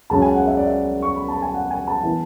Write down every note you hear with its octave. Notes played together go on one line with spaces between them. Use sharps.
C#2 C#3 F#3 C#4 A5
G#5
F#5
E5
D5
E5
C#6
B5
A5
G#5
F#5
G#5
A5
E3 B3 E4